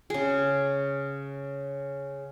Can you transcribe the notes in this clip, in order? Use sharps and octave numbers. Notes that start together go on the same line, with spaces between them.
C#3 G#4